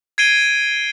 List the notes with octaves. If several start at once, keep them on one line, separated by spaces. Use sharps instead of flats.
G#6 C7 D7 D#7 G7